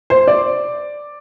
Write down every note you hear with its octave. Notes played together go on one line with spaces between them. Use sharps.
C5
D5